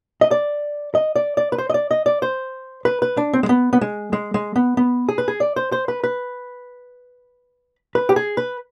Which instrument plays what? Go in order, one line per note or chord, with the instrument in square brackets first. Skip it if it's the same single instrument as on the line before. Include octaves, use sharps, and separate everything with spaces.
[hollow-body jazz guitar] D#5
D5
D#5
D5
D5
B4
C5
D#5
D5
D#5
D5
C5
B4
B4
D4
C4
G#3
B3
B3
G#3
G#3
G#3
B3
B3
G#4
B4
G#4
D5
C5
C5
B4
B4
B4
G4
G#4
B4